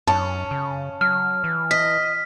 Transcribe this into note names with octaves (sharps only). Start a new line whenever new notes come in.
F#2 C#4 A5
C#3
F#3 F6
E3
D#5 B6